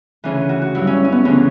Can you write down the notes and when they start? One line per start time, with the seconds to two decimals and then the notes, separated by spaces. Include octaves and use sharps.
0.24 D2 C#3 E3
0.49 F#4
0.62 F#4
0.75 G2 F#3 E4
0.87 C#4
1.05 C#4
1.12 B3
1.25 D2 C#3 E3 C#4